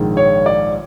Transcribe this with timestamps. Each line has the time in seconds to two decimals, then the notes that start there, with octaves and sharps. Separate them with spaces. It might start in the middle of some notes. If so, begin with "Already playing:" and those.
Already playing: A#1 G#2 D#3
0.17 C#5
0.46 D5